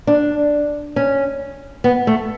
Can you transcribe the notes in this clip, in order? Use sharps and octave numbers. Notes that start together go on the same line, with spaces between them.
D4
C#4
B3
A3